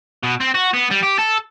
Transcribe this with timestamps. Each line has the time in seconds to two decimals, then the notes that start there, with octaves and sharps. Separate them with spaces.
0.23 B2
0.41 C4
0.55 F#4
0.74 B3
0.91 G3
1.03 G4
1.19 A4